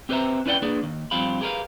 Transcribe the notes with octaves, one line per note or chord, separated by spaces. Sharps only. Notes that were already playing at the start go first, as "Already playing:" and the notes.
C4 G4 B4 C5 E5 A#5
C#4 E4 B4 D5 F#5 G5
A#3 D4 G#4 B4 D5
D#2
G2 F3 C4 G4 F5 B5
G4 G#4 A#4 B4 F5